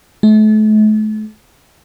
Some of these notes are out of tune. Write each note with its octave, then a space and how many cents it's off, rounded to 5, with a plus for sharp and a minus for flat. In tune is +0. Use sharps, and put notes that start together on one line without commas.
A3 -40